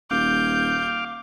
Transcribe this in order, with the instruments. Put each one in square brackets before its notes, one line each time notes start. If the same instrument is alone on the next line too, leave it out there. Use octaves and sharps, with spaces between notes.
[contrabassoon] D#1 [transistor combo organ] F5 D6 [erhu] G6